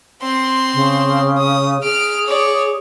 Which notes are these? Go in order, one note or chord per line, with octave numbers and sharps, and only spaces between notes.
C4 C6
C#3
D#6
G#4 F6 D7
C#5 D5